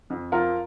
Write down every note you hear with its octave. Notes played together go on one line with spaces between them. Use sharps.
F2
F3 F4 A#4